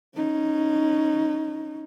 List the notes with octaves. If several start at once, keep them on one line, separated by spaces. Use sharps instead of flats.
C#4 D#4